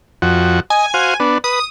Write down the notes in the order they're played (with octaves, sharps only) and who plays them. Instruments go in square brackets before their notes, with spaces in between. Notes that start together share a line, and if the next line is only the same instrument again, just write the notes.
[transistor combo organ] F2 F#4
[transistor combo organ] D#5 [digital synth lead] G#5
[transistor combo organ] F#4 C5 F5
B3 D4
[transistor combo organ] B4 [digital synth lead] D#6